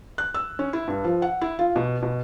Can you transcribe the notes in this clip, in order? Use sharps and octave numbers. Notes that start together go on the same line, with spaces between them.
F#6
E6
C#4
E4
G2
F3
F#5
E4
F4
B2
B2